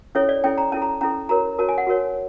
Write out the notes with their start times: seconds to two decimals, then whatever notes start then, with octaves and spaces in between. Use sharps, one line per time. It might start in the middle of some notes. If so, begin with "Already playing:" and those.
0.15 C#4 E4 A4 C#5
0.29 D5
0.44 C#4 E4 A4 G5
0.58 A#5
0.72 C#4 E4 A4 A5
0.82 A#5
1.01 C#4 E4 A4 A#5
1.29 F#4 A#4 C#5 A#5
1.58 F#4 A#4 C#5 A5
1.69 G#5
1.78 F#5
1.87 F#4 A#4 C#5